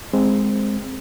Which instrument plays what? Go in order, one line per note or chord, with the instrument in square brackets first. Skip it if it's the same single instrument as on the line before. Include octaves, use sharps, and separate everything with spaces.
[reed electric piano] G#3 C4